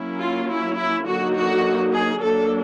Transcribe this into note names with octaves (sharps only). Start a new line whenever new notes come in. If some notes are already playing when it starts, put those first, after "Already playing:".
Already playing: F#3 A#3 C#4 E4
F4
E4
E4
D3 F#3 A#3 D#4 F#4
F#4
G#4
F#3 A#3 D4 A4